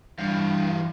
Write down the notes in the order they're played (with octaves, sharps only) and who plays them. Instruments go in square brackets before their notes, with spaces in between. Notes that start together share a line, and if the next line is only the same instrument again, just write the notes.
[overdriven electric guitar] G2 [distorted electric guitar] E3 F5